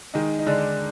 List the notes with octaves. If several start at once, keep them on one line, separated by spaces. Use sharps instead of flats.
D#3 G#3 D#4
D#4
D3 G#3 D4